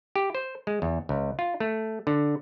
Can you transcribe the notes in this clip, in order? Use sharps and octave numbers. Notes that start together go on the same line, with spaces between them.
G4
C5
G#3
E2
C#2
F4
A3
D3